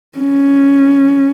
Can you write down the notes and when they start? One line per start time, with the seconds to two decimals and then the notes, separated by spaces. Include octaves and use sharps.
0.19 C#4